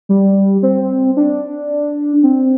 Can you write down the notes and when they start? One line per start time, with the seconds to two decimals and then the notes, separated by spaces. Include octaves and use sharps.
0.09 G3
0.63 C4
1.17 D4
2.23 C4